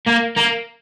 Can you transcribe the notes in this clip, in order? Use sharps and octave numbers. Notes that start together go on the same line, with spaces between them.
A#3
A#3